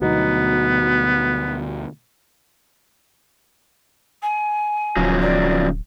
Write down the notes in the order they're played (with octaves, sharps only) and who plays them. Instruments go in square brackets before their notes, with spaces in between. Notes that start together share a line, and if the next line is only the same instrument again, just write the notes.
[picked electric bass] D2 B2 [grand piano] F#3 D#4 [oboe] B3
[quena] G#5
[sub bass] D1 [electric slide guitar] C#3 F3 F#3
[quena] D5